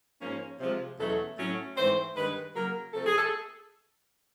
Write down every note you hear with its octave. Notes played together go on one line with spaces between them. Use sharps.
G#2 F3 A#3 C#4
C3 F3 G#3
E2 B2 F#3 A3 C#4 A4
A2 F#3 A3 C#4
G#2 E3 A3 C4 C5
G2 D#3 G#3 B4
C#3 F#3 A#3 A#4
C3 F3 A3 C4 A4
G#4
A4